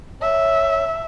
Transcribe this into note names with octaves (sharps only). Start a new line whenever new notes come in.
C#5 E5